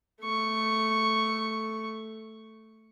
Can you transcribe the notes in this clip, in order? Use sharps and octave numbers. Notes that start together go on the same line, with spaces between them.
A3 C#6